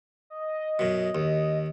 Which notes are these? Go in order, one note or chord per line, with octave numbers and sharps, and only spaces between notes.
D#5
F#2 B2
D#2